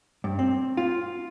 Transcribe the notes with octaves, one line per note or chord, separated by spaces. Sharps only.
G2
C4
F4